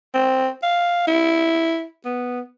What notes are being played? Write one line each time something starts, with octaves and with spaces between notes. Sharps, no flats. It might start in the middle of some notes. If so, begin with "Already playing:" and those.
C4
F5
E4
B3